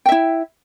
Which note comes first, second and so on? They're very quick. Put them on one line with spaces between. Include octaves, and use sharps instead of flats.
G5 E5 E4